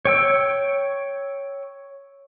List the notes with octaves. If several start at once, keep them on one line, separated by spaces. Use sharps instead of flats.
C#5 G5 E6